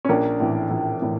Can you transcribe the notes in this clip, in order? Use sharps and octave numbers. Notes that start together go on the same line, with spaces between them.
C#4
A#1 A#3 D4
A2 E3
A#1
A2 E3